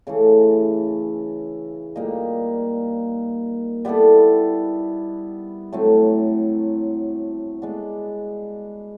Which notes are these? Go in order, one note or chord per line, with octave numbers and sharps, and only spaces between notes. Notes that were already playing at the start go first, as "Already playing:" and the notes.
C#3 E3 A3
A#2 G3 A#3 D#4
G3 B3 E4 A4
A2 F#3 A3 C4
G#3 B3 D4